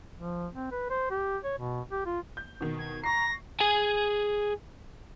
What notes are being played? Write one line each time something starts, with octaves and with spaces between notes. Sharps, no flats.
F3
C4
B4
C5
G4
C#5
B2
G4
F4
G6
B2 D#3
G#6
A#5 C#6 A#6 C7
G#4 G#5